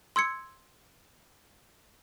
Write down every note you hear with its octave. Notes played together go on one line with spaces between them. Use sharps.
C6 E6 G#6 C#7